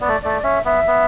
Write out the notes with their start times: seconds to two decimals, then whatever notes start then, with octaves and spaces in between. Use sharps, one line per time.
0.01 B3 D5
0.08 A3
0.22 A3 D5
0.44 C#4 E5
0.65 B3 E5
0.87 B3